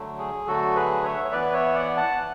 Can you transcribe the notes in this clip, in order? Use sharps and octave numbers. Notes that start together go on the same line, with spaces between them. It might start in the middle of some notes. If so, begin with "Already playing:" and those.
Already playing: D3 F#3 A3
G#4
D3 F#3 A3 F#4 A4
G#4 B4
C#5 E5
C#5
E3 B3 B4 D5
C#5 E5
D5 F#5
F#5 A5
E3